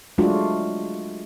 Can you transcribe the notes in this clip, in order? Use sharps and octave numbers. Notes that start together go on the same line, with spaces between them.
F#3 G#3 A3 D4 F4 F#4